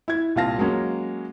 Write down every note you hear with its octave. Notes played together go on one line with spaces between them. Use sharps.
E4 G#6
C2 A#2 F4 F5 A5 A#6
F#3 G#3 A#3 C#4